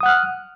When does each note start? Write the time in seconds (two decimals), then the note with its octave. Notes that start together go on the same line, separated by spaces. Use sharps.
0.01 D#6
0.03 F#5
0.06 F#6
0.08 F6